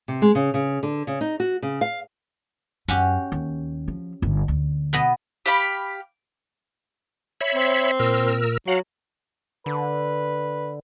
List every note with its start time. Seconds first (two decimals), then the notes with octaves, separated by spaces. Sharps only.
0.08 C3
0.22 G#3
0.35 C#3
0.54 C#3
0.83 D3
1.07 C#3
1.21 D#4
1.40 F#4
1.63 C#3
1.81 F5
2.88 F#2 C#4 F#4 G4
3.32 D#2
3.88 F3
4.22 G1 G2
4.48 D2
4.93 B2 B3 D#5
5.46 G4 F5 B5
7.41 C#5 E5 B5
7.55 C4
8.00 A#2 A#4 E6
8.68 F#3 F5 F#5
9.66 D3 B4